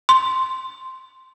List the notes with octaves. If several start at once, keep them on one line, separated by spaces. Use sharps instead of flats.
C6